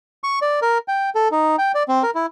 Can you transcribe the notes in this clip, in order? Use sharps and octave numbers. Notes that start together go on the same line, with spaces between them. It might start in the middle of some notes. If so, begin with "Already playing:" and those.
C#6
D5
A#4
G5
A4
D#4
G5
D5
C4
A#4
E4